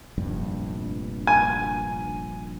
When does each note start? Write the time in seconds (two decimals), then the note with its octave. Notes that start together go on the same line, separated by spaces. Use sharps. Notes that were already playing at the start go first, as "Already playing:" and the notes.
0.18 F1 A#1 G2
1.27 G#5